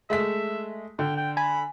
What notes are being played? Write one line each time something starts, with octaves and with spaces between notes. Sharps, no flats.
G#3 A3 E5 B6
D3 G5
G5
G#5 B5